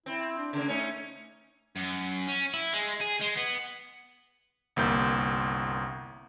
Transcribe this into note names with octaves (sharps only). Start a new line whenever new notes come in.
C4 E4
D4
C#3 A#3 D4
A3 C#4 D#4
F#2
C#4
E4
G#3
G#4
G#3
B3
G1 C2 A#3 G6